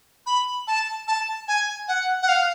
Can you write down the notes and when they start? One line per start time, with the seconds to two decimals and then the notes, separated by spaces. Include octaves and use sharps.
0.26 B5
0.67 A5
1.08 A5
1.48 G#5
1.88 F#5
2.22 F#5
2.28 F5